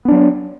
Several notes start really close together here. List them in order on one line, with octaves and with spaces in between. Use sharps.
B3 D4 F#3